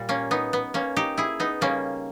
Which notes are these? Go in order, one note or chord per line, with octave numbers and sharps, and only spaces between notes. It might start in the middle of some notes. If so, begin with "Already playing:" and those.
Already playing: A#2 G3
A#3 C#4
B3 D#4
B3
A#3 C#4
D#4 G4
E4 G#4
B3 D#4
C#3 G3 A#3 C#4